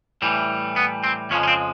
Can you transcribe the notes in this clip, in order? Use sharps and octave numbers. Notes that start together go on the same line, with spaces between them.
A2 E3 G3
B3
C4
F2 C#3 F3 G#3 C#4
C#4
C4